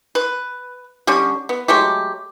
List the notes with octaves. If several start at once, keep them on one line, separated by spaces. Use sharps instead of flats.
B4
D3 G3 C#4
B3
F#3 G#3 A3 G4